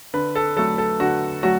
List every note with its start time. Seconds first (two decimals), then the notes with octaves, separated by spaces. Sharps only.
0.14 D3 B4
0.35 A4
0.57 F#3 A3 A4
0.78 A4
1.00 D3 F#4
1.43 F#3 A3 F#4